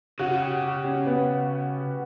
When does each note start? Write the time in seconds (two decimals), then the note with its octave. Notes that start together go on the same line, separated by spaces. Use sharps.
0.19 C#3 F#4
0.41 G4
0.62 G4
0.84 C#4
1.06 B3